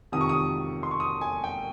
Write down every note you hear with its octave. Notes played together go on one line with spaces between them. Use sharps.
F2 C3 D#3 D#6
C#6
D#6
C6
C#6
D#6
G#5
G5